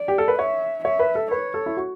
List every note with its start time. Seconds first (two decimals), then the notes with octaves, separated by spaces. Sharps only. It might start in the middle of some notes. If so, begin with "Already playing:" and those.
Already playing: D5
0.08 G4
0.18 A4
0.28 B4
0.38 C#5 E5
0.84 C#5 E5
0.99 B4
1.15 A4
1.31 B4 C#5
1.54 A4
1.66 E4
1.77 F#4